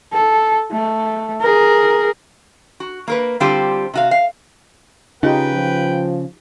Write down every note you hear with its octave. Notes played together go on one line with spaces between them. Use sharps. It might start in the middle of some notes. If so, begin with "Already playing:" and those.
A4
A3
G#4 A#4
F#4
A#3 A#4 B4
D3 G3 C4 F4 G4 C5
C3 F#4 F5
F5
C#3 D#4 F4 G4 B4 G5
F3